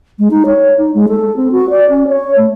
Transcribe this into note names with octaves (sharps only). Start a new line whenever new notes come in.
G#3
D#4
C#5
D#4
G#3
A4
C4
F#4
D5
C#4
C#5
A3